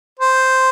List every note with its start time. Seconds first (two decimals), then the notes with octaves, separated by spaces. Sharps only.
0.19 C5